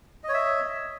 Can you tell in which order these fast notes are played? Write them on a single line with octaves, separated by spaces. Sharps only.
D#5 C#5 E5